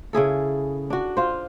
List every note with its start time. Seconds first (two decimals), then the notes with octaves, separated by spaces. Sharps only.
0.13 C#3 E4 G#4 A4
0.90 D4 F#4
1.17 F4 C5